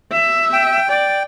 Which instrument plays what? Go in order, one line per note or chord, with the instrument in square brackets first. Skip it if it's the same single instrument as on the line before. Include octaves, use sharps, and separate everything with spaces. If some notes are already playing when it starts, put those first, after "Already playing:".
[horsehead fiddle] E5
[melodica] G5
[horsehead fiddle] D5 [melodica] G5